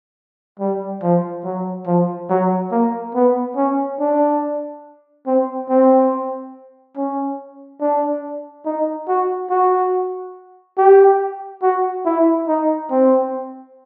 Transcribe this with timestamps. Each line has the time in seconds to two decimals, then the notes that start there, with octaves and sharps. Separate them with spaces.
0.60 G3
1.02 F3
1.44 F#3
1.87 F3
2.30 F#3
2.71 A#3
3.15 B3
3.57 C#4
4.00 D4
5.27 C4
5.69 C4
6.97 C#4
7.81 D4
8.66 D#4
9.08 F#4
9.50 F#4
10.78 G4
11.62 F#4
12.05 E4
12.48 D#4
12.90 C4